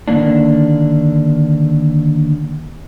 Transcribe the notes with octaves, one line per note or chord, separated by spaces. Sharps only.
D3 D#3 A#3 C#4 D4